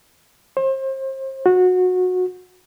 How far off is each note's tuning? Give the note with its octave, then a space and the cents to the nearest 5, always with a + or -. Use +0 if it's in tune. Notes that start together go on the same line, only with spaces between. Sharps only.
C5 +35
F#4 -20